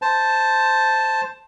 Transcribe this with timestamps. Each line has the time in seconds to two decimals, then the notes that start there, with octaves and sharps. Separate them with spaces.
0.02 C5 A5